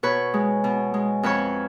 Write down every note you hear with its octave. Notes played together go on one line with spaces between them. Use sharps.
B2 B4 C#5
G#3
B2
G#3
F2 B4 C#5